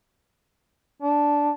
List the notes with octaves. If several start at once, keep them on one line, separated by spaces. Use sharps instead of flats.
D4